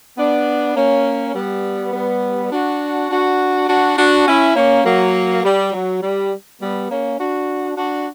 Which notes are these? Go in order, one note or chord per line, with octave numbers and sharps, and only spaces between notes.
B3 D4
A#3 C#4
G3 B3
G3 B3
D4 F#4
D4 F#4
D4 F#4
D4 F#4
C#4 E4
A#3 C#4
F#3 A#3
G3
F#3
G3
G3 B3
A#3 C#4
D4 F#4
D4 F#4